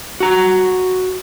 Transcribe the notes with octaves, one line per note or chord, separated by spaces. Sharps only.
F#4 A#5